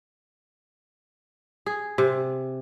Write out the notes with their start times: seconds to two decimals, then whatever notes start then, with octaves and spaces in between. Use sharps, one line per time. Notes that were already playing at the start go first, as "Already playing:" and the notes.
1.66 G#4
1.98 C3